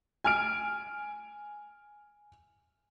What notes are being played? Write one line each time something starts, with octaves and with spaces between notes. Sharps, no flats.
G#5 F6 D7